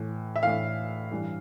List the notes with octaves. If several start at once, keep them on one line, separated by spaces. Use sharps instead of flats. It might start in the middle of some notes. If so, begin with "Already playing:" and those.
Already playing: A2 E3
E5
A2 E3 F5
G2 E3